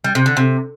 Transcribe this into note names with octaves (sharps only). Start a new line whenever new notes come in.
G3
C3
D3
C3